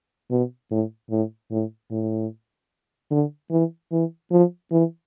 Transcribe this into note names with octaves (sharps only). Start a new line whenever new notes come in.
B2
A2
A2
A2
A2
D3
E3
E3
F3
E3